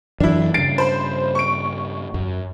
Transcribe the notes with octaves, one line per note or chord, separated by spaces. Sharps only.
F#2 E3 F#3 D4 E4
G2 C#3 A6 C7 D7
C5 B5
C#6 D7
F#2 F#3